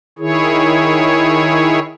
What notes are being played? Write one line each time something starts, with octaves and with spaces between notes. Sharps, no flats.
D#3 E4 G#4 C#5